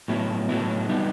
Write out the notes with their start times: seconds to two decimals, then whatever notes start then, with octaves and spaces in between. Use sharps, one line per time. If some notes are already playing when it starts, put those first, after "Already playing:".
0.08 A2 F#3 B3 E4
0.49 A2 F#3 B3 E4
0.89 G3 B3 D#4